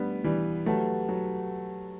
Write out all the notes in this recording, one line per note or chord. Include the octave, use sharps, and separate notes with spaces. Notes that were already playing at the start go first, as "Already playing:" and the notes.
Already playing: G3 A3 B3 D4
E3 G3
F#3 A3 G4 B4 F#5 A5
F#3